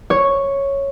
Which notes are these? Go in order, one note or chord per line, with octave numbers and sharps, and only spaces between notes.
C#5